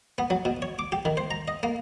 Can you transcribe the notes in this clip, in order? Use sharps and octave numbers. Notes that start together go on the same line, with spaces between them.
B3
F#3
B2
C#5
D6
G4
D#3
C5
A#5
D#5
A#3